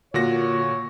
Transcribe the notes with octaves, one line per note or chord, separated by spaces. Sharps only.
A#2 D3 A#3 F4 F#4 C#5 A#6